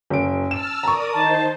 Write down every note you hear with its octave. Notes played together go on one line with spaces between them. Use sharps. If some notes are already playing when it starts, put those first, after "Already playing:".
F#1 D7
A5 E6 F6 E7
A#4 D5 A#5 C#6 D#6
D#3 D#4 C5 A5